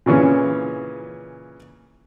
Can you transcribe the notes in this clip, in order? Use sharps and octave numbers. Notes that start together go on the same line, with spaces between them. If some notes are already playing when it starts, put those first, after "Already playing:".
A#2 C#3 E3 C#4